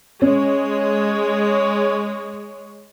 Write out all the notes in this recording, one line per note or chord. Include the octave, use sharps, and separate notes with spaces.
G#3 C#4 C#5